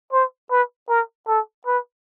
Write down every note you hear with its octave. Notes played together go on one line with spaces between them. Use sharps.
C5
B4
A#4
A4
B4